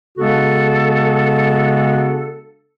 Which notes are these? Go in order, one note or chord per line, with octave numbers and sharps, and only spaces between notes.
C#3 G#3 B3 D4 F#4 A4